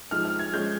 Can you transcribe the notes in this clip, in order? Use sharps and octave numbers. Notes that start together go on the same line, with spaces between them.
F3 G#3 D#4 F6
F6
G#6
F3 G#3 C#4 G6